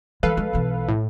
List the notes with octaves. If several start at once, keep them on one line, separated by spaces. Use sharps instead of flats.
E3 G#3 A4 B4 F5
G#3
B1 E3
A2